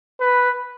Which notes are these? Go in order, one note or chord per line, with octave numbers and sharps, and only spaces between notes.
B4